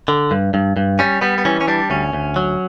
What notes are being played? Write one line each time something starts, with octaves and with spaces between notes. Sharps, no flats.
D3
G2
G2
G2
G3 C#4
G3 B3
B3
E3 C#4
C#4
G3 D4
D2 C#4
D2
F#3